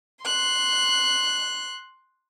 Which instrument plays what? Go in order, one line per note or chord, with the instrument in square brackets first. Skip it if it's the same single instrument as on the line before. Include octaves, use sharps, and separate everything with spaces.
[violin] C6 F#6